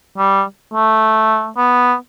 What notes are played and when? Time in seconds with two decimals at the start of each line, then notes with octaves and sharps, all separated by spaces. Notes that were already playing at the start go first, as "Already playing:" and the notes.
0.18 G3
0.74 A3
1.57 B3